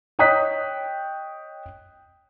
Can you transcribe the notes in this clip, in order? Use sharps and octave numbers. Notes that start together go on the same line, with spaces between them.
C#5 D#5 G5 D#6 F#6 B6